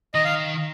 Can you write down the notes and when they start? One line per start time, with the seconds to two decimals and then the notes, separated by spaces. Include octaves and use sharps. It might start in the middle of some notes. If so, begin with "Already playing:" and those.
0.14 D#3 D#5
0.25 F5